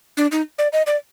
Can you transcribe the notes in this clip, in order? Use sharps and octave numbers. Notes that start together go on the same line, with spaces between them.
D4
D#4
D5
D#5
D5